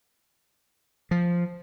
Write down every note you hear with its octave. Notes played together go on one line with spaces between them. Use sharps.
F3